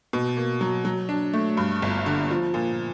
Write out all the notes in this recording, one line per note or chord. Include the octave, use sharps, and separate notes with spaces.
B2
A#3
F#3
F#3
D4
A3
G2
G1
D3
F3
A#2